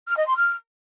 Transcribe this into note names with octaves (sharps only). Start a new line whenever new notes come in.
F6
D#5
C6
F6